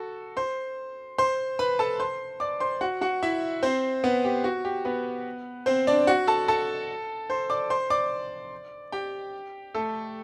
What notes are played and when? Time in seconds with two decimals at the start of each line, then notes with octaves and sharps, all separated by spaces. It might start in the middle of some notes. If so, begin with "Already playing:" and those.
Already playing: F#4 A4
0.37 C5 C6
1.18 C5 C6
1.59 B4 B5
1.79 A4 A5
2.00 C5 C6
2.40 D5 D6
2.60 C5 C6
2.81 F#4 F#5
3.01 F#4 F#5
3.23 E4 E5
3.63 C4 C5
4.04 B3 B4
4.25 G4
4.44 F#4
4.65 G4
4.85 B3 B4
5.66 C4 C5
5.87 D4 D5
6.07 F#4 F#5
6.27 A4 A5
6.48 A4 A5
7.30 C5 C6
7.50 D5 D6
7.70 C5 C6
7.90 D5 D6
8.92 G4 G5
9.75 A3 A4